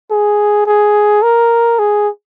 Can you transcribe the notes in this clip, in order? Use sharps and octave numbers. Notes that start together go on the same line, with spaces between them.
G#4
G#4
A#4
G#4